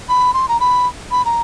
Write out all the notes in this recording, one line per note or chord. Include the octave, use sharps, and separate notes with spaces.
B5
C6
A#5
B5
B5
A#5